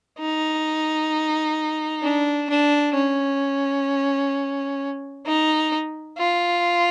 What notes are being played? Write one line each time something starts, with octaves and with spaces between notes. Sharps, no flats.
D#4
D4
D4
C#4
D#4
F4